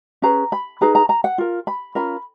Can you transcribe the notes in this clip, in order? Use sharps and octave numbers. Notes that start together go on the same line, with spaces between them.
C#4 G#4 B4 A#5
B5
D#4 G#4 B4 A#5
A#5
A#5
F#5
F4 A#4
B5
C#4 F4 A#4 B5